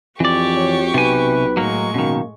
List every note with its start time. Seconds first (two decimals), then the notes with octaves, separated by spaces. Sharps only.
0.20 F2 E3 F#4 G4 D5 C#6
0.57 C#5
0.94 B1 C3 B4 G#5
1.57 A2 F#3 G#3 A#3 C#6
1.94 F#2 B2 D#3 A#3